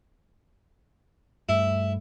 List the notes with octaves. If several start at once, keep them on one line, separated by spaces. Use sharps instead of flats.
G2 A3 E4